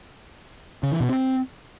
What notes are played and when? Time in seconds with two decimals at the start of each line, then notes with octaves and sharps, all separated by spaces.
0.83 C#3
0.92 E3
1.00 B2
1.09 C4